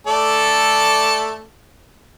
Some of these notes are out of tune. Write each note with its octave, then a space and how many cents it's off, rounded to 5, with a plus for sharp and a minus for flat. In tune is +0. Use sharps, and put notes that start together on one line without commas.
A3 +0 A4 +0 D5 -5